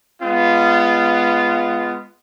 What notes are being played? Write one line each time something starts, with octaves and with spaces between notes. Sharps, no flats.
G#3 B3 F4